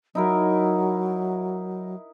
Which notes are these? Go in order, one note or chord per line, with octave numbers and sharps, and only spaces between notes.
F#3 D#4 E4 A#4